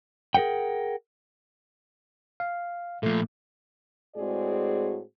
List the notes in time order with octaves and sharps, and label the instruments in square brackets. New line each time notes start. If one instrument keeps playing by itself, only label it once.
[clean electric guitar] G#4 A#4 B4 F#5 G5
[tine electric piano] F5
[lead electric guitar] A#2 F3 [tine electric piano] A3
[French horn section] A2 G#3 C4 F#4 G#4 D5